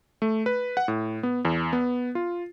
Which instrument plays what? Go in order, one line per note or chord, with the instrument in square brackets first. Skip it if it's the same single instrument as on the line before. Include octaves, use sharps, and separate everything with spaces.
[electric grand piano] A3
B4
F#5
A2
B3
E2
B3
F4